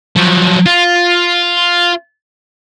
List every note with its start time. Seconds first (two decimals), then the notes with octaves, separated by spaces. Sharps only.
0.16 F3 F#3
0.66 F4